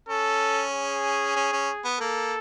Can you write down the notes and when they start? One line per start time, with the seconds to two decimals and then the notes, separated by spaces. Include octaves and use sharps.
0.09 C#4 A4
0.72 G#4
1.36 C#4
1.52 C#4
1.84 B3
2.00 A#3 A4